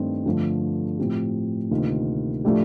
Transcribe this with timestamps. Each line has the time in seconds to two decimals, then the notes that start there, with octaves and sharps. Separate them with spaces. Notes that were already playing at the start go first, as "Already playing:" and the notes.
Already playing: G2 D#3 A3 C4 D#4
0.26 G2 D3 F3 A3
0.98 A2 F3 C4 G4
1.71 D2 C3 D#3 A#3 F4
2.44 A2 F3 A3 D4 G4